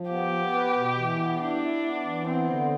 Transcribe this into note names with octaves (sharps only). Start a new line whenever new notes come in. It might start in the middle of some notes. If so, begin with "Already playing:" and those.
Already playing: F3
B3 G4
B3
B4
B2
E3
B3
D4 E4
E4
B3
E3
B3 C4
D3